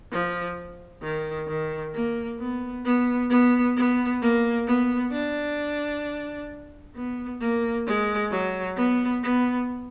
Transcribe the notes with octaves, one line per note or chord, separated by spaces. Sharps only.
F3
D#3
D#3
A#3
B3
B3
B3
B3
A#3
B3
D4
B3
A#3
G#3
F#3
B3
B3